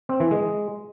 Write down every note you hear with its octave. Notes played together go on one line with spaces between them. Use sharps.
C4
E3
G#3